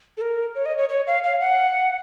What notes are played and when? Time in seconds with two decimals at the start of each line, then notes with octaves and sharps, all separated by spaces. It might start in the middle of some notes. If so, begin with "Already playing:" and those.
0.17 A4
0.21 A#4
0.55 C#5
0.66 D#5
0.77 C#5
0.89 C#5
1.07 F5
1.24 F5
1.40 F#5